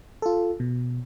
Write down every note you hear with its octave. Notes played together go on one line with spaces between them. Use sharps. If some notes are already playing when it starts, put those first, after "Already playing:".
F4 A4
B2